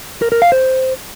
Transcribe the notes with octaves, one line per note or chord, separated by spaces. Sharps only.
A#4
A#4
F5
C5